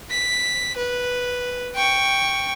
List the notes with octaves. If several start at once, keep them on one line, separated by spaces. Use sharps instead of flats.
B6
B4
G5 C#6